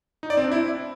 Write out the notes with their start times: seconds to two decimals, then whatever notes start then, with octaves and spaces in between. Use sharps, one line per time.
0.23 D#4
0.30 D5
0.37 C4
0.44 D4
0.51 E4